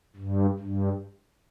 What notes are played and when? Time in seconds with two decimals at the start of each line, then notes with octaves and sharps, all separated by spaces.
0.16 G2
0.59 G2